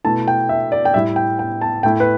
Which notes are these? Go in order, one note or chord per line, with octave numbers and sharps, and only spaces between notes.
B2 A3 E4 A5
G5
E5
D5
G5
A2 G3 E4 E5
G5
G5
A5
A2 A3 E4 G5
B4